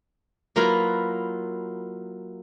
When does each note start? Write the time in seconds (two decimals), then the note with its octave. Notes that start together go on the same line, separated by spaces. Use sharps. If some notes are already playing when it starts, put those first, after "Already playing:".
0.56 F#3 A#3 E4 F4 A#4 B4